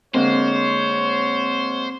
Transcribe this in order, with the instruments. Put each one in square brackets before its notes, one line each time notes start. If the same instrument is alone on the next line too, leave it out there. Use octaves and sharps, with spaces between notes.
[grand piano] D3 G#3 A#3 [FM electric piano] C4 [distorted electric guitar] C5 [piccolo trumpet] C#5